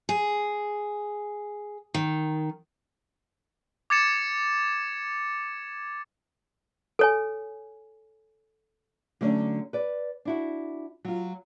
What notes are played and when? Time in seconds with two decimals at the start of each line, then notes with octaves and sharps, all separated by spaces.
0.09 G#4
1.94 D#3
3.90 D6 G#6 A6 C#7 E7
6.99 A4 C#5 G#5
9.21 D3 F#3 A3 C#4 D4
9.73 B4 D5
10.25 D4 E4 F#4
11.05 F#3 F4